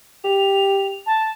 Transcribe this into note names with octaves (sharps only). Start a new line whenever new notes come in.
G4 F7
A5